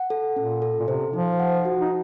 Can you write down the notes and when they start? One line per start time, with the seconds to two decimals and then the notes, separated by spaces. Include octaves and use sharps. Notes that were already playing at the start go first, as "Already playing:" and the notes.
Already playing: F#5
0.10 A4
0.36 A#2 C#4
0.62 A4
0.80 A#2
0.88 C3 C5
1.13 F3 D#4
1.39 F#5
1.65 F#4
1.81 D#4